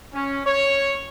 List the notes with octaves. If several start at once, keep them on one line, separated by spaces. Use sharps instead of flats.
C#4
C#5